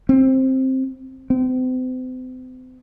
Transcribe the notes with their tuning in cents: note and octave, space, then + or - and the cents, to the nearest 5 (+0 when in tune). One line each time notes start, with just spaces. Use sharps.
C4 +10
C4 -40